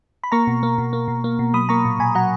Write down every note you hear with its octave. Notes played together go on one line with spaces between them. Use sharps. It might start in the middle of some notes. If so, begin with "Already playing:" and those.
B5
A#3 A#5 C#6
B2
A#3
B2
A#3
B2
A#3
B2
F#3 B5 D#6
A#3 A#5 C#6
A#2
A#2 G#5 B5
F#3 F#5 A#5